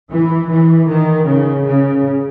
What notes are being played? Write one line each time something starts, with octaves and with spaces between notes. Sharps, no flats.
E3
E3
D#3
C#3
C#3